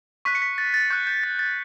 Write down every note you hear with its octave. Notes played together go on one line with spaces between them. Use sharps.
C#6 F#6 B6
C#7
B6
A6
A6
C#6 F#6 G6
G6
A6
A6